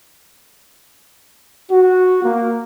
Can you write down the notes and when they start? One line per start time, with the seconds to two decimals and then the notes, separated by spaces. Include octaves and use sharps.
1.70 F#4
2.23 A#3